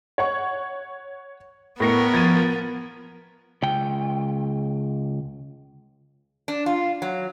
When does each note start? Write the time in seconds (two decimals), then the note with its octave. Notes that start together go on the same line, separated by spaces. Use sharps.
0.18 C#5 F#5 C#6
1.80 A2 B3 A#4 A#6 C#7
2.14 F3 G#6 A6 D#7
3.63 C#2 G5
6.48 D4
6.66 F4
7.02 F#3